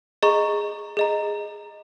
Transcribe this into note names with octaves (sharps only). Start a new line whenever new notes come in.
G#4 D#5 A#5 C#6
G#4 D#5 A#5